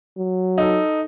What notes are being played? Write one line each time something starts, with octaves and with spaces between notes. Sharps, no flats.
F#3
D#4 A4